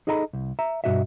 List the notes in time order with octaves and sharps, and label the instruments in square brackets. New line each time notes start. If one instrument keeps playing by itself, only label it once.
[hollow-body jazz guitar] D#4 G#4 A4 D#5 A#5 B5
C2
E5 A#5
G2 B2 D#3 F#4 D#5 E5